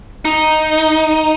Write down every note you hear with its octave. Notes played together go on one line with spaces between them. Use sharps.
D#4